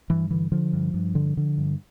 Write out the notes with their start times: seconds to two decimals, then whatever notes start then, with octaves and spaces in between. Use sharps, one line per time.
0.10 G2 E3
0.31 D3 E3
0.52 D3 F3
0.73 G2
0.94 G2
1.15 D3
1.37 D3
1.58 G2